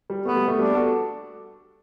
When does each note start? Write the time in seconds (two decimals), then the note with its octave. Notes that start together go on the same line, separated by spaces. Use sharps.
0.10 G3
0.25 A3 B3
0.36 G3
0.48 A3
0.59 G3 B3 D4
0.75 F#4 A4